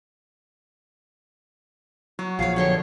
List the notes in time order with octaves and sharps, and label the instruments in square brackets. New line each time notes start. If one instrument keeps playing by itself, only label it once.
[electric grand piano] F#3 [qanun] F#4
[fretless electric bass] A#1 F3 [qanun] G#4 C#5 [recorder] F5
[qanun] B2 D3 G5 [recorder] C#5